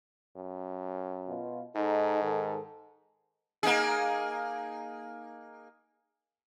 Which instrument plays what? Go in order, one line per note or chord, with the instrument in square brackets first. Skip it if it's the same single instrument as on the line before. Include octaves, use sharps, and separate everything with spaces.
[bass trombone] F#2
[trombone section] B2 F4
[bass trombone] G#2 [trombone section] D#4 A4
[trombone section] D#3 A4
[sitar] A#3 D#4 G#4